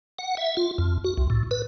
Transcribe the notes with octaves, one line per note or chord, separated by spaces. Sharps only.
F#5
E5
F4
F2
F#4
C2
A2
B4